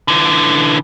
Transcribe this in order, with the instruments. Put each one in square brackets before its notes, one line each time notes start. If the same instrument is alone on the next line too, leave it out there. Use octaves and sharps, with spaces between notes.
[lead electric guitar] D3 E3